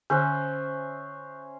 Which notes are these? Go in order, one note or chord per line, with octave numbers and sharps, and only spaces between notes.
D3 C#4 C5 E5 F#6 G6